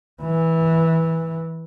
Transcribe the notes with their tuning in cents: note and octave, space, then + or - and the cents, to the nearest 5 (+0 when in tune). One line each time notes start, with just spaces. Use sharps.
E3 -15